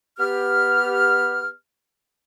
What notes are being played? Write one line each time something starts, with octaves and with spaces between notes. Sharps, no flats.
B3 G4 F6